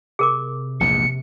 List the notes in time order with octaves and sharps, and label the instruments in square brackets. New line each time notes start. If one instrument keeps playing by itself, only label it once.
[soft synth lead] C3 [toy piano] G#4 A#4 D6
[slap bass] A#1 E2 G#2 [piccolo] C#7